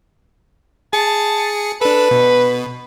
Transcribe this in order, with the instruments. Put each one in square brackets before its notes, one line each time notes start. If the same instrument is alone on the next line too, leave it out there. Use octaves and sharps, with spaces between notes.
[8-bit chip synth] G#4 C#7 [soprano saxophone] A5
[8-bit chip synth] D4 A4 [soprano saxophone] B4
[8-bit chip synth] B2